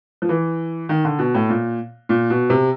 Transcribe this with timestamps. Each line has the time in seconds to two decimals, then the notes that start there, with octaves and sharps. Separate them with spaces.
0.22 F3
0.29 E3
0.89 D#3
1.05 D3
1.19 B2
1.34 A2
1.49 A#2
2.09 A#2
2.30 B2
2.50 C3